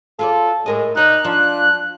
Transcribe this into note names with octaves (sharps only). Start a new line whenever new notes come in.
F4 G#4 A4 D5
A2 G#3 A#4 D#5
B2 D#4 D5 F#6
F3 D4